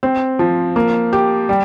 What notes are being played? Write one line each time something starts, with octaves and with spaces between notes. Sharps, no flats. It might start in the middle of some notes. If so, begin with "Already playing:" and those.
C4
F3
A#3
G4
G3